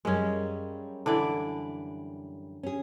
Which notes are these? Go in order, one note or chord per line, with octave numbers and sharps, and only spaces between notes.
F#2 G3 G#3 A#3 C#4
D3 E3 D5
C#4 G#4